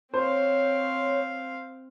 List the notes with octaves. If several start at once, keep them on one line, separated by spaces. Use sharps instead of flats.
C4 C5 C#5 F5